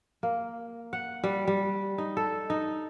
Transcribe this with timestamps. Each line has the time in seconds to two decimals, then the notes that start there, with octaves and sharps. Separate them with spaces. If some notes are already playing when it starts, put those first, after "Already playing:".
0.23 A#3
0.93 F#5
1.24 G3
1.47 G3
1.98 D#4
2.17 A4
2.50 D#4